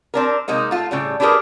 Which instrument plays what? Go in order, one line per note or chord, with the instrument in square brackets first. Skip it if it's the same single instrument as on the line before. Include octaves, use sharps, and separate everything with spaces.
[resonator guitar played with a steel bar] C4 D4 A#4
C3 G#3 A#3 D#4
A3 F4
A2 C#3 G3
D4 E4 G4 G#4 A#4 B4